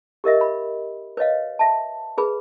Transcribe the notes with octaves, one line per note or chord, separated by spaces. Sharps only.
G4 A#4 D#5 E5
B5
B4 C#5 D#5 F5
E5 A5
G#4 B4 B5